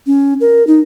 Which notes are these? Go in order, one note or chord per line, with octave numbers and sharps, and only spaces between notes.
C#4
A#4
D#4